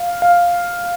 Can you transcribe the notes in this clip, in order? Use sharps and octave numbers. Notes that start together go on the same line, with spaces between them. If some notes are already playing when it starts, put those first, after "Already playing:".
Already playing: F5
F5